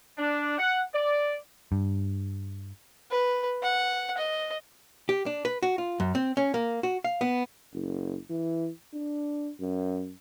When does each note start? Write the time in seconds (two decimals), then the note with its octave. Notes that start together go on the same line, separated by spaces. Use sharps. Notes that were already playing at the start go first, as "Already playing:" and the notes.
0.18 D4
0.58 F#5
0.94 D5
1.72 G2
3.11 B4
3.62 F#5
4.17 D#5
5.09 G4
5.26 D4
5.45 B4
5.63 F#4
5.78 F4
6.00 F#2
6.15 C4
6.37 C#4
6.54 A#3
6.83 F#4
7.04 F5
7.21 B3
7.74 F#1
8.30 E3
8.94 D4
9.60 F#2